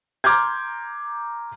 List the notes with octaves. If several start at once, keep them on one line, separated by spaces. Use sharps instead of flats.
A#5 C6 D6 F6 G6 G#6